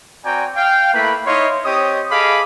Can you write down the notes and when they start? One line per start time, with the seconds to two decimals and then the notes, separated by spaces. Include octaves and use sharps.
0.25 C4 F#4 D5 G5 G#5 A#5
0.56 F5 G5
0.94 A3 A#3 E4 B4 B5
1.26 D#4 E4 C#5 D#5 F5 C6
1.65 C4 G4 C#5 D#5 D#6
2.11 G#4 A4 D#5 F5 B5 D6